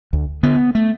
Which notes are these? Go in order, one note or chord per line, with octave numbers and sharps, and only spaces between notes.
D2
D3 B3
A3